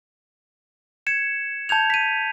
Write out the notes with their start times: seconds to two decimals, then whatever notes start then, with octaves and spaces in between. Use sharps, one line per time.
1.07 G#6 C#7 E7
1.69 A5 G6 G#6 F7
1.90 B6 D#7